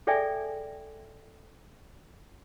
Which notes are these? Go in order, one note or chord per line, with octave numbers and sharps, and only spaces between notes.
G#4 A4 D5 E5 G5 G#5